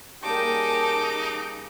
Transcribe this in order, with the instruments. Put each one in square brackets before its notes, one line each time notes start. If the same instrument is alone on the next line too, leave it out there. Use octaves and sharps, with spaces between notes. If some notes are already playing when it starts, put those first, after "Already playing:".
[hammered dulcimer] C#3 G3 A#3 [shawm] D#4 [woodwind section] G4 G5 A5 [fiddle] D6